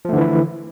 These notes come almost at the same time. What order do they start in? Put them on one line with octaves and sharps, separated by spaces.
F3 A3 D3 E3 E4